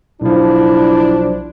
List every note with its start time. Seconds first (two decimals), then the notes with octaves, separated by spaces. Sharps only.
0.21 B1 F3 D4 E4